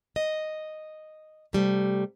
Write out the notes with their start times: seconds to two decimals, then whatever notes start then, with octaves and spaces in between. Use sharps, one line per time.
0.16 D#5
1.53 C3 G3 A3